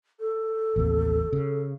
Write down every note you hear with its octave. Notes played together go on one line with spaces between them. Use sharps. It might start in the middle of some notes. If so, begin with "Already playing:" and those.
A4
A1 D#2 C3
C#3